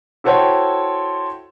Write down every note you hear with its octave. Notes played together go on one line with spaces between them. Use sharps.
E4 F#4 A4 C5 C#5 G5